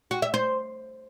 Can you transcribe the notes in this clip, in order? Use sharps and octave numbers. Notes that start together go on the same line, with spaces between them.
F#4
E5
C5